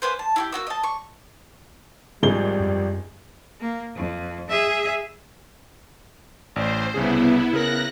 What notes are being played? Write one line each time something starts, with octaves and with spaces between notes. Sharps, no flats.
A#3 C#4 B4 C5
A5
E4 F#4 G4
A#3 D#4 F#4 E6
D#5 A5
C#6
G#1 F3 G3 G#3 G7
F#2
A#3
F2
G#4 E5
A1 C5 D5
C2 C#3 B3 E4 G#4
C#3 A#4 F#6 A#6